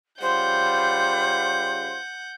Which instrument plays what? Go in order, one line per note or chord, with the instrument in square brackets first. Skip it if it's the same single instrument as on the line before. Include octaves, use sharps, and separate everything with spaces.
[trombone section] C#3 G3 F4 [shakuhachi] C5 [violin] F#5 G6